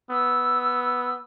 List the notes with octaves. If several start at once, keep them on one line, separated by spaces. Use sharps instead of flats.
B3 E6